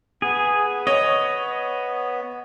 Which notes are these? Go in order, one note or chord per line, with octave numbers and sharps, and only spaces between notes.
B3 G#4
C#5 D#5